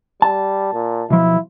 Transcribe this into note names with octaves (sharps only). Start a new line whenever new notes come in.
G3 A5
A#2
B1 F3 E4